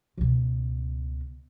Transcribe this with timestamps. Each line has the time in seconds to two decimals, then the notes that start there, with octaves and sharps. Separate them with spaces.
0.18 C#2 B2